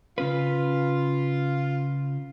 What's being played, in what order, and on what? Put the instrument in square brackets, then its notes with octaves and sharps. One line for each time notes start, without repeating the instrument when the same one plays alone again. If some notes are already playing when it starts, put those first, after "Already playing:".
[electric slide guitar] C#3 C#4 B4 [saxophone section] F4